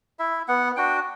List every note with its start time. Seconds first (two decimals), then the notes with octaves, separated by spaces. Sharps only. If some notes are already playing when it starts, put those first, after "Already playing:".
0.19 E4 E5
0.48 B3 F#5
0.77 D4 F#4 G5